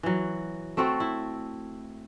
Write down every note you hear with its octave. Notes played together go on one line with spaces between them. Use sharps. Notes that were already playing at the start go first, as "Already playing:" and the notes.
E3 F#3
A3 C4 F#4 A4
E4